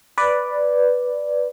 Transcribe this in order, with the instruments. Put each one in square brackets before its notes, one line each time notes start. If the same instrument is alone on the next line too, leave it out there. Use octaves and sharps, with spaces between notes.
[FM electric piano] B4 D5